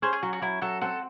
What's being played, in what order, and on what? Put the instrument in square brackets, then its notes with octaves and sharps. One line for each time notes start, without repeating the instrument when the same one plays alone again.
[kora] C#4 [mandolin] G#4 C5
[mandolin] G#4
[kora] F#3 [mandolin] F#4
[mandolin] F#4
[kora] F#3 [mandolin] E4
[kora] F#3 [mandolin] F#4 A4
[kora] C4 [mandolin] F#4 A4